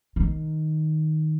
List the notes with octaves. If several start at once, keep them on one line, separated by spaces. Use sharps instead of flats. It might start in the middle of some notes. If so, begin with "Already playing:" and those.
D#3